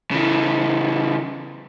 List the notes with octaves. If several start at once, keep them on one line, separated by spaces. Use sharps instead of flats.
C#3 E3